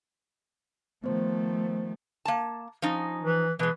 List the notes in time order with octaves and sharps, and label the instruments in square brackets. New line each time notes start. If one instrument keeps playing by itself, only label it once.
[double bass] D#3 F3 [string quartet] A3 [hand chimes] B3 C5
[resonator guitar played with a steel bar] A#3 A5
F3 C#4 D#4
[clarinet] E3
[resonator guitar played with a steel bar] B2 G#3 [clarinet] E3